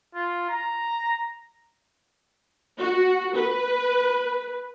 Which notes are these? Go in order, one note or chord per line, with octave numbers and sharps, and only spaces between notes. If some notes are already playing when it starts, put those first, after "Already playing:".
F4
A#5
F#4
B4